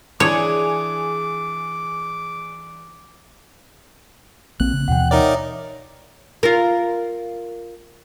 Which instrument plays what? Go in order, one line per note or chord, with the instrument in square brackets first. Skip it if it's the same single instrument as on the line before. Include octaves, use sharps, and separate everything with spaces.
[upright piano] E3 D4 [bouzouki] G#4 [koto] C#5 [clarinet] D6
[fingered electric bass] A#1 A#3 C4 [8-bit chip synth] F#6
[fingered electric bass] C#3
[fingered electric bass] D#2 B2 E3 [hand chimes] F#5 G5
[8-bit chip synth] D#4 A#4 D5 [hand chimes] C#5 E5 D#6
[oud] F4 A#4